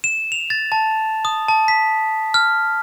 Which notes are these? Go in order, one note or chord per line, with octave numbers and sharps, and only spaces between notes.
E7
F7
A6
A5
D#6
A5
B6
F6